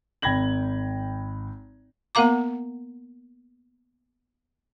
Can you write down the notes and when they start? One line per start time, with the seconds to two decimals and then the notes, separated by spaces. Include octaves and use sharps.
0.22 G#1 G5 B5 G#6 A#6 F#7
2.15 A#3 B3 A#4 F5 A#5 D6